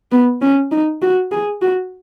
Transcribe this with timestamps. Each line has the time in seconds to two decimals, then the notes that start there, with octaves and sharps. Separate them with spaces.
0.12 B3
0.41 C#4
0.71 D#4
1.02 F#4
1.31 G#4
1.62 F#4